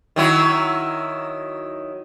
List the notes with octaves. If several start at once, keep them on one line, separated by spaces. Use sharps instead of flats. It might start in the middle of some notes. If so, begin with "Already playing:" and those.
D#3 F#3 E4